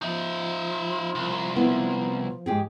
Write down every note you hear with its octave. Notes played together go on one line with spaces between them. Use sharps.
F3 D#4 E5
C2
B3 E4
G#2 G4 G#4